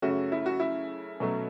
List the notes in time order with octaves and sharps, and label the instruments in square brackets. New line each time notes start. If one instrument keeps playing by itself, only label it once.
[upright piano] F#2 C#3 A3 C#4 F#4
E4
F#4
E4
B2 F#3 A3 C#4